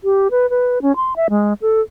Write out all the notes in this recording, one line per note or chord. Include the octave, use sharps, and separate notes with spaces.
G4
B4
B4
C#4
C6
E5
G#3
A4